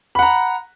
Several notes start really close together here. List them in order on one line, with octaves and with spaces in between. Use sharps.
B5 F#5 A#5